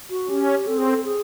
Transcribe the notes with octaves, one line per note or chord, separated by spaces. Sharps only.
F#4
C#4 G4
C4 A4
G#4
A4
G#4